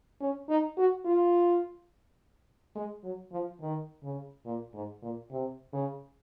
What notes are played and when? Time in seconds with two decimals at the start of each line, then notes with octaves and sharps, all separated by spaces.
0.21 C#4
0.49 D#4
0.78 F#4
1.05 F4
2.75 G#3
3.03 F#3
3.32 F3
3.61 D#3
4.03 C#3
4.45 A#2
4.74 G#2
5.02 A#2
5.31 C3
5.73 C#3